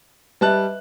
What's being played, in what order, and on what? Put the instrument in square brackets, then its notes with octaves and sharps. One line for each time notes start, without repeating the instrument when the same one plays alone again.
[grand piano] G3 A5 F#6 [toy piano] B4 D#5 E5